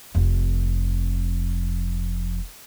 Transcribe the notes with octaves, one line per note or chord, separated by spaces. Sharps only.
F1 F2